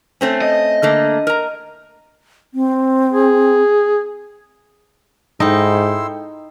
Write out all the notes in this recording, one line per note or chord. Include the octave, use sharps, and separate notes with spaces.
A3 C4 C#4
D#5
D3 A3 A#3
A#4 A#5
C4
G#4
G#2 D#4 E4 A4 G5 C6 E6